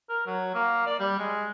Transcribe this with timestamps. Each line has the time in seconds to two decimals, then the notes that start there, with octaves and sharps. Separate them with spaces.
0.09 A#4
0.26 F#3
0.55 A#3
0.87 D5
1.00 G3
1.19 G#3